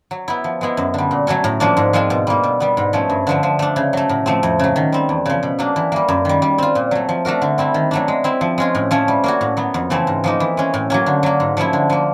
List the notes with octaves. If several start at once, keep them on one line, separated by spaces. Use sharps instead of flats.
F#3
B3 E4
F3
G#3 B3 E4
F#2
D3 G3
A#2
F#3 A3 C#4 F#4
A2
F3 A#3 D4
G#2
F3 G#3 C4 F4
B2
G3 A#3
B2
G3 B3
G#2
F3 A3 C#4
G2
D3 F3 A3
F3
A3 D4
C#3
F#3 A3
A2
F3 A3 C4
F2
C#3 F#3
D#3
G3 C4
E2
C#3 F3
B2
F#3 A#3 D4
E3
G3 A#3
F#2
D#3 G3
G3
C4 F4
A#2
F#3 A3
F3
A3 D4 F#4 A#4
D3
G3 C4 E4
D#3
F#3 A3 D4
G#3
C4 E4
F3
G#3 C#4 F4
A2
F3 A3 C#4 F4
G3
A#3 C#4 F#4
A2
F#3 B3
F2
C#3 E3 A3 C4
G#2
F3 A#3 D#4
E3
G#3 C#4
A2
F#3 A#3 C#4
D3
F#3 A#3
G#2
F3 A3 C#4 E4
D3
F3 A#3